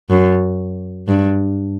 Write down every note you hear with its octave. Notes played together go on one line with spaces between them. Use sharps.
F#2
G2